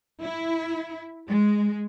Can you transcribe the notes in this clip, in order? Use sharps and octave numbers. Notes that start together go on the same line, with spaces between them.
E4
G#3